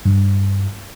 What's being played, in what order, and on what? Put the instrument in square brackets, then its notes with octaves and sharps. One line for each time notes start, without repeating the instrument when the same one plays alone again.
[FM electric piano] G2